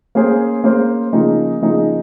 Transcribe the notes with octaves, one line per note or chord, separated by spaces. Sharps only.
A#3 C#4 G#4 C5
A#3 C#4 G#4 C5
C#3 F3 A#3 D#4 G#4
C#3 F3 A#3 D#4 G#4